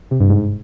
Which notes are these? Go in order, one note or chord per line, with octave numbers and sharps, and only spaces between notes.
C3
G2
G#2